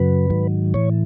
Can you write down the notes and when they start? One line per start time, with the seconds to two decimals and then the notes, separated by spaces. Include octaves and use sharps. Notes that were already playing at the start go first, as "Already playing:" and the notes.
Already playing: F#2 C#3 F#3 B4
0.30 G#2 D#3 F#3
0.74 A2 E3 C#5